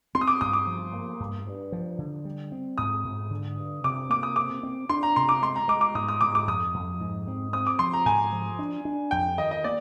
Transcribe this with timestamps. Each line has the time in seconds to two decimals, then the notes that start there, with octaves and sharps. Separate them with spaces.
0.15 C4 C6
0.21 D#6
0.28 D6
0.41 G2 D#6
0.53 D6
0.67 F3
0.93 A#3
1.20 G2
1.47 G2
1.72 F3
1.98 D3
2.25 G3
2.52 C4
2.78 G#2 D#6
3.04 G#2
3.30 D3
3.57 G2
3.84 C3 D6
4.10 A#3 D6
4.23 D#6
4.36 C4 D6
4.63 C4
4.89 D4 C6
5.03 A#5
5.16 C3 C6
5.29 D6
5.42 G#3 C6
5.56 A#5
5.68 G#3 D6
5.81 D6
5.95 G#2 D#6
6.08 D#6
6.21 G#2 D6
6.35 D6
6.47 F2 D#6
6.74 F2
7.00 G#2
7.27 C4
7.53 C4 D#6
7.67 D6
7.79 F3 C6
7.93 A#5
8.05 G#2 G#5
8.33 F3
8.59 D4
8.85 D4
9.11 F2 G5
9.38 D#3 D#5
9.51 D#5
9.64 A#3 D5